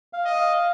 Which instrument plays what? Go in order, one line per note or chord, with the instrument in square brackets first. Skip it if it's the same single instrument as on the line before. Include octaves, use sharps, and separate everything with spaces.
[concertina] F5
[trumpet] D#5
[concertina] F5